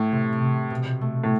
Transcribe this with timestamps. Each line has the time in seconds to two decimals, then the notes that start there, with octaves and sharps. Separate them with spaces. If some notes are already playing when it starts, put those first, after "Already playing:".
Already playing: A2
0.12 C3
0.42 C3
0.71 B2
1.01 A3
1.24 A2